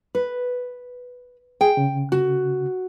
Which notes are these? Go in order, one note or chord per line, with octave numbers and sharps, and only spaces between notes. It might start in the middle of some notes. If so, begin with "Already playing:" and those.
B4
G#4 G5
C#3
F#4